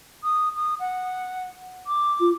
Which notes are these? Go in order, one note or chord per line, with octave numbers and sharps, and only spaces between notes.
D#6
D#6
F#5
D6
F4